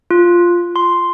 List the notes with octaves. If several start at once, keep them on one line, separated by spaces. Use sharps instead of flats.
F4
C6